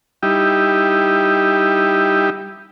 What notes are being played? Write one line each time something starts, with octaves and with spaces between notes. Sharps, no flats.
G3 D#4 E4 G4